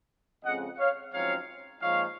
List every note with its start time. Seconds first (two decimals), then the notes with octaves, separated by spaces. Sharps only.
0.44 F2 C#3 G#3 C4 D#5 F#5
0.78 C#5 F5
1.12 F#2 F3 G#3 C4 D#4 C#5 F5
1.81 A#2 F3 G#3 D#4 C#5 F5